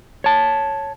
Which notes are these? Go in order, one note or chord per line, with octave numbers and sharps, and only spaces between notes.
C#5 A5